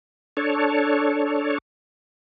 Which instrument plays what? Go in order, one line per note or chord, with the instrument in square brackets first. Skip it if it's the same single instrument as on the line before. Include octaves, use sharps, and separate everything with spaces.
[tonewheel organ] D4 A4 C#5